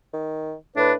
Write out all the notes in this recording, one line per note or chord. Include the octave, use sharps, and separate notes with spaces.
D#3
A2 D4 B4